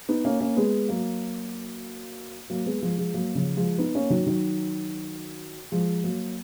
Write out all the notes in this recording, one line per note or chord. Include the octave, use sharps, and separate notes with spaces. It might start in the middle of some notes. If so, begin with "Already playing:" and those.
B3 D#4
A#3 C#4
A#3 C#4
G#3 B3
F#3 A#3
F#3 A#3
G#3 B3
F3 G#3
F3 G#3
F#3 A#3
C#3 F3
F3 G#3
B3 D#4
A#3 C#4
D#3 F#3
D#3 F#3
F3 G#3
F#3 A#3